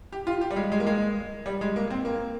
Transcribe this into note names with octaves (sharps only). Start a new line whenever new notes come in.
G4
F4
G4
G3
G#3
G#3
A#3
G#3
G3
G#3
A#3
C4
A#3